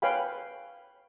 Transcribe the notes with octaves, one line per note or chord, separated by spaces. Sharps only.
B4 C#5 F5 G5 G#5 B5